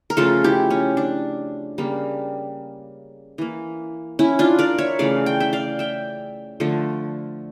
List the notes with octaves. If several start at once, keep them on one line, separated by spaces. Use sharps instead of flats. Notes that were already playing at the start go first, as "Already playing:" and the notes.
A#4
C#3 F3 A3 F4 A4
E4 G4
C#4
D4
C#3 G3 A#3
E3 A#3
C#4 E4
D4 F4
A#4 D5
C#5 E5
C#3 E3 A3 D5 F5
G5
E5 G5
D5 F5
E5 G5
D3 F3 A3